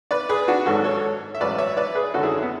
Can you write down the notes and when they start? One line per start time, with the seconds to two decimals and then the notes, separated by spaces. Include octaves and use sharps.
0.11 B4 D5
0.29 G#4 B4
0.48 D4 F#4
0.66 G#1 G#2 F#3 F#4 A4
0.84 A4 C#5
1.35 E5
1.40 A1 G#2 F#3 B4 D5
1.58 C#5 E5
1.77 B4 D5
1.95 G#4 B4
2.14 G#1 F#2 D3 F#3 F#4 A4
2.23 E4 G#4
2.43 B3